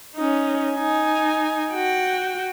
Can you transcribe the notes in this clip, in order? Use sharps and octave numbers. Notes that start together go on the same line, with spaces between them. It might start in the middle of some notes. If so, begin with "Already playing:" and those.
C#4 D#4
D#4 G#5
F#4 G5